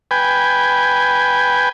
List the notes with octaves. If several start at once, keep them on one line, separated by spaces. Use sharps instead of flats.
B4 G5 G#5